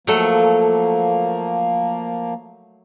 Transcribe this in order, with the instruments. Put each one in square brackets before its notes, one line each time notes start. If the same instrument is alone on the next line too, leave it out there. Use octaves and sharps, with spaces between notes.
[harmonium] F3 A#3 [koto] F#3 A3